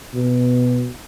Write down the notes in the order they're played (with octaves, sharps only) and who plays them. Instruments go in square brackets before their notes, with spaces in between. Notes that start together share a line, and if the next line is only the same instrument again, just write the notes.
[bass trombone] B2